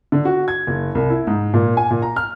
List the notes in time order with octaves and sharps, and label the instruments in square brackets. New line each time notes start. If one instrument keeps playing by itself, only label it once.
[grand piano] D3
F#4
G#6
F#1
C2
E4
G#2
A#2
G#5
A#2
A#5
F6